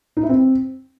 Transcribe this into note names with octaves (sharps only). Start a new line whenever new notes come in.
D#4
E4
C4